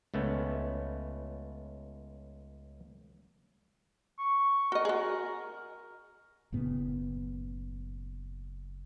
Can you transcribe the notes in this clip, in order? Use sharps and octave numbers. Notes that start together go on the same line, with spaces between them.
C#2 A3 B3 C#4
C#6
F#4 A#4 D#5
F#4 G#4
F#1 A2 C#3 B3